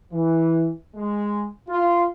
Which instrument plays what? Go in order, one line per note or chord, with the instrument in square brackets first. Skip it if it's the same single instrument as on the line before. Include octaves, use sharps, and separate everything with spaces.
[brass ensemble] E3
G#3
F4